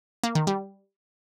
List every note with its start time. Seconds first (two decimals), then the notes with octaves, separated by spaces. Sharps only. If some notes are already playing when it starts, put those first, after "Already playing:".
0.23 A#3
0.35 D#3
0.47 G3